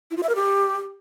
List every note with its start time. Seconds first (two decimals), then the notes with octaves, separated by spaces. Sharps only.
0.11 E4
0.17 F4
0.23 E5
0.29 A#4
0.35 G4